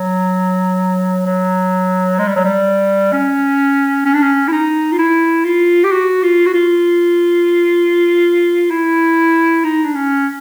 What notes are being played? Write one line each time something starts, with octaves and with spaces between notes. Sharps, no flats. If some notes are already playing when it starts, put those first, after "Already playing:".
Already playing: F#3
F#3
G#3
G3
F#3
G3
C#4
C#4
D4
C#4
E4
D#4
F4
E4
F4
G4
F#4
F4
F#4
F4
E4
D#4
D4
C#4